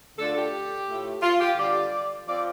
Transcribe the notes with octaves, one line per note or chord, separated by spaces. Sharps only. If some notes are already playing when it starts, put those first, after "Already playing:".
D3 A3 D4 F4 A4
G4
A2 A3 F4
F4
G4
D3 G3 F4 D5
F3 C4 F4 D5